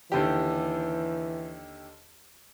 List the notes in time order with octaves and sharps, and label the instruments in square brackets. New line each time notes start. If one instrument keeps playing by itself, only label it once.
[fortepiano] D#2 D3 G4 [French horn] E3